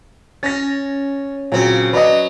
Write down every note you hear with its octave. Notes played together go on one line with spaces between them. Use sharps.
C#4 A6 A#6
A#2 C#3 F#3 C4
F#3 B4 D5 D#5